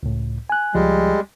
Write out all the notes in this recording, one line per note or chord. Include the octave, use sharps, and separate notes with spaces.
C#2 A2
G#5 F#6
C#2 F3 G3 G#3